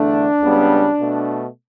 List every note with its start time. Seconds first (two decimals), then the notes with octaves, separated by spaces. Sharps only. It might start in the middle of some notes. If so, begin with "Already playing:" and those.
Already playing: E2 D3 A3 D4
0.41 C#2 C#3 G3 B3
1.00 B2 A3